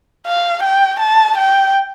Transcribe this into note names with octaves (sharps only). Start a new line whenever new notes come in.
F5
G5
A5
G5